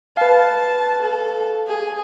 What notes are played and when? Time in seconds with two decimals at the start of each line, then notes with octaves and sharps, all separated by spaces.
0.17 B4 F5 A5
1.02 A4
1.67 G#4